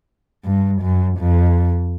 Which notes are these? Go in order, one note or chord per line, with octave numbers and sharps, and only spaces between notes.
G2
F#2
F2